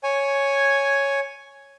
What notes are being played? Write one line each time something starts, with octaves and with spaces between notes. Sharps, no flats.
C#5 G#5